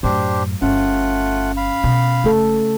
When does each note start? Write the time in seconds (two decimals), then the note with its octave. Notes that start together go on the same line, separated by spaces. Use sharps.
0.03 F#2 A2 D4 G4 C5
0.62 G1 A3 C#4 F4 F#5
1.57 F5 B5
1.84 B2
2.24 F#1 C#3 A3 A#3 A4